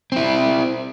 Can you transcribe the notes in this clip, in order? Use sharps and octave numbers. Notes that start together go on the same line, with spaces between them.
C4 E4